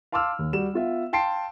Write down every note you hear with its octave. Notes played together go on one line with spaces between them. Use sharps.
F5 A5 C6 D6 E6 F6
D#2
G3 F#4 E7
B3 F4 E5
F5 G5 A5 C6 C7 D7